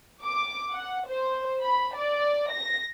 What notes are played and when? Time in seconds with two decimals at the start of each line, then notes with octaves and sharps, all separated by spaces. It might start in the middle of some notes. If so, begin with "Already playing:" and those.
0.22 D6
0.72 F#5
1.09 C5
1.61 B5
1.95 D5
2.52 A#6